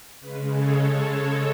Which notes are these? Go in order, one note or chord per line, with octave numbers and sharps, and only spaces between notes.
C#3 G#3 B4
A4 C#5
A4 C#5